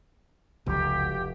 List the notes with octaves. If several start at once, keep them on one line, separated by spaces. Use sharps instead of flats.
F1 C#2 F#2 F#3 G4